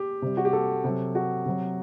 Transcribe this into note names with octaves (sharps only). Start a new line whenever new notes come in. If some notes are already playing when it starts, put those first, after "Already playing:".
Already playing: G4
C3 G3
F#4
G4
A4
C3 F#3
F#4
C3 F#3